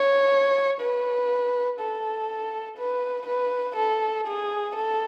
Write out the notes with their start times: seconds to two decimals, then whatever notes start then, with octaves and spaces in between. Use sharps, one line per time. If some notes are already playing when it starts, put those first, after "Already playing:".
Already playing: C#5
0.81 B4
1.80 A4
2.77 B4
3.27 B4
3.76 A4
4.27 G#4
4.76 A4